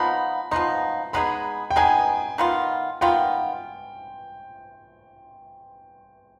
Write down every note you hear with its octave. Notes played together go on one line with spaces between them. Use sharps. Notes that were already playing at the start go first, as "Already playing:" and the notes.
Already playing: F3 B3 D#4 B5
F3 B3 D#4 C6
G#3 B3 D#4 G#4 B5
G5
G#3 B3 D#4 G#4 G#5
D#3 B3 F4
D#3 B3 F4 G5